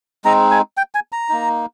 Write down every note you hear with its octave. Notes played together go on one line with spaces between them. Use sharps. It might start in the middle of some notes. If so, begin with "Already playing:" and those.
G#3 C4 D#4 A#5
G#5
G5
G#5
A#5
A#3 D#4